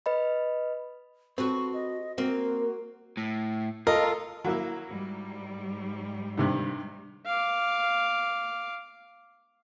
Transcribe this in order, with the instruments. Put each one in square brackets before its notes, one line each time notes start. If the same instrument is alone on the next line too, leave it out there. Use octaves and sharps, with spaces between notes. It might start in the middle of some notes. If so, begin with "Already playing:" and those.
[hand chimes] B4 D#5 B5
[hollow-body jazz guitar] C4 [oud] F#4 A4 B4 [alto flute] C#6
[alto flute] D#5
[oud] A#3 [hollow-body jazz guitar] C4 [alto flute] F#4
[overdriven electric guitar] A2
[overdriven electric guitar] F4 [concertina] A4 [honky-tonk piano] A#4 [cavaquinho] D#5
[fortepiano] F#3 A#3 E4
[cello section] G#2 G3
[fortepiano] G2 C3 D#3
[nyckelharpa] F5 D6